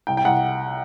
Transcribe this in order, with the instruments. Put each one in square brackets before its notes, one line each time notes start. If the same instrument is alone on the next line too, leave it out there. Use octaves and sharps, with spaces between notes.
[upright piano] C2 G5
G5
C2 F#5